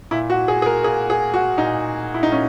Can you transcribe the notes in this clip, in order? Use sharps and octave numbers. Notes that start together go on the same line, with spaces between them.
A#2 E4
F#4
G#4
G#4
A#4
A#2 G#4
G#4
F#4
A#2 D#4
E4
D#4
A#2 C#4